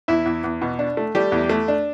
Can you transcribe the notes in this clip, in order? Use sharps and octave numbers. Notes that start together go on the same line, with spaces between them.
E2 E4 E5
E2
E2
B2
D4
A3
G3 A3 G4
E2
A3
D4